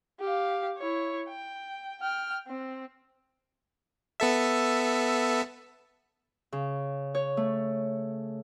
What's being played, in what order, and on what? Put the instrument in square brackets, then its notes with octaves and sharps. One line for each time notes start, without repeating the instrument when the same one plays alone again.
[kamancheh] G4 F5
E4 C#5
G5
G5 F6
C4
[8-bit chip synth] B3 A4 E5
[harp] C#3
C#5
A3